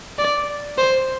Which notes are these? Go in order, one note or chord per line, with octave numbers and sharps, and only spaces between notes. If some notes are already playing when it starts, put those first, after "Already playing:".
D5
C5